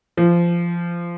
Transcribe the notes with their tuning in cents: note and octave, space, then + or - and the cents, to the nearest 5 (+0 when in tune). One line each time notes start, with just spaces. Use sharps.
F3 -20